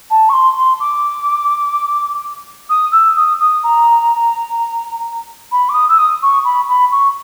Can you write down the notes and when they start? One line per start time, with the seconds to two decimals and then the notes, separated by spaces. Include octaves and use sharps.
0.10 A5
0.29 C#6
0.33 C6
0.57 C6
0.80 D6
2.69 D#6
2.92 E6
3.16 D#6
3.40 D#6
3.63 A#5
5.52 B5
5.69 D6
5.74 D#6
5.89 E6
5.97 D#6
6.22 C#6
6.45 B5
6.68 B5
6.92 C#6